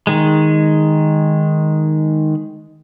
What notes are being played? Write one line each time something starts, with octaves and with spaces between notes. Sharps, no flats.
D#3 G#3